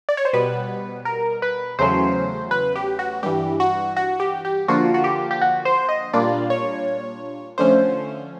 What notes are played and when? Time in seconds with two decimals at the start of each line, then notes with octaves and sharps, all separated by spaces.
0.09 D5
0.17 C#5
0.25 C5
0.33 B2 G3 B3 B4
1.05 A#4
1.42 B4
1.79 E2 C#3 F#3 A3 C#4 C5
2.51 B4
2.76 G4
2.99 F#4
3.23 G2 E3 G3 G4
3.60 F#4
3.97 F#4
4.20 G4
4.45 G4
4.68 D3 F3 A#3 D4 F4 F#4
4.94 F#4
5.04 G4
5.31 G4
5.41 F#4
5.65 C5
5.89 D#5
6.13 A#2 G3 A#3 D4 F4 D5
6.50 C#5
7.58 D3 F3 A3 C#4 C5